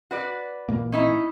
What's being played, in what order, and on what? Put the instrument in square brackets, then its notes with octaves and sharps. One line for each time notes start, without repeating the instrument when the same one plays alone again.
[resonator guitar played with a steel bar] F#4 B4 D5
[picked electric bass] A1 A#2 A#3
[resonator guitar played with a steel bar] C#4 D#4 E4